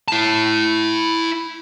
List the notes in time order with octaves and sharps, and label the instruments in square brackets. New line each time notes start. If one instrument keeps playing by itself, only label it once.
[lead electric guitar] E4 A5